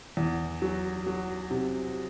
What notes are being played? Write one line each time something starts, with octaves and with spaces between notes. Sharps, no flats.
E2
F#3
F#3
C3